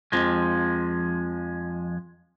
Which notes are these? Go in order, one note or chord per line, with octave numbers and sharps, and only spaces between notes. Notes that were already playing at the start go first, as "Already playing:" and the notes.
F2 F3 G#3